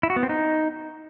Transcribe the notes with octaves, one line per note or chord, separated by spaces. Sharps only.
E4
F#4
B3
C4
D#4